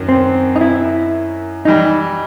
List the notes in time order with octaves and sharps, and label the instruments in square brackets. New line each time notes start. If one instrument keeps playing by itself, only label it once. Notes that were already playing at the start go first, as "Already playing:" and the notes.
Already playing: [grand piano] F#2 D#3 F#3
[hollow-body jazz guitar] C4
D#4
E4
[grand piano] E3 G3 [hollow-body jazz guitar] D#4